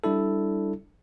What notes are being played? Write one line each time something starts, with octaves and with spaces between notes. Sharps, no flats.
G3 D4 E4 A4